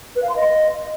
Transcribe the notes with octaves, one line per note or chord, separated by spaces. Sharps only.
B4
F5
C6
D#5